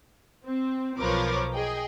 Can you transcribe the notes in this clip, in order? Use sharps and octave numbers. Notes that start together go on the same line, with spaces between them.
C4
B1 F3 A#4 B4 C#5 D6
G#4 D#5 G5